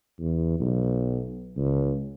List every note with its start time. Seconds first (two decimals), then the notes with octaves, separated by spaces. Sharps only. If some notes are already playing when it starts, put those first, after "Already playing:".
0.20 E2
0.60 B1
1.57 C#2